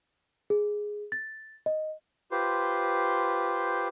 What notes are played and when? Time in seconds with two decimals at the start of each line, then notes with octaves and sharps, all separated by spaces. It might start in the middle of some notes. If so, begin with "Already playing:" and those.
0.50 G#4
1.12 A6
1.66 D#5
2.31 F4 G4 B4 C5 C6